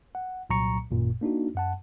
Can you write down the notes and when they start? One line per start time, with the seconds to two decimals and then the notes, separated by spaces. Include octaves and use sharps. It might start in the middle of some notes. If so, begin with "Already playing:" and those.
0.15 F#5
0.50 C2 A#2 F#3 A#5 C#6 C#7
0.91 G#1 F#2 A#2
1.21 A#3 D4 D#4 F#4
1.55 F#2 F#5 A5